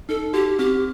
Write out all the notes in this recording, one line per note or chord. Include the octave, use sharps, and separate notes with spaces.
D#4 A4
F#4 G4
C4 G4